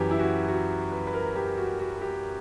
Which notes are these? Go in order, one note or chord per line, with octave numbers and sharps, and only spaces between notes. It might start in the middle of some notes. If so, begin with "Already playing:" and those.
Already playing: F#2 E3 G4
E4
F#4
F#4
B4
B4
A#4
G4
F#4
F#4
G4